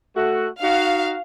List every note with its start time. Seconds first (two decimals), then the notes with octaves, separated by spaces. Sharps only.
0.16 A3 F#4
0.62 D#4 F#4 F5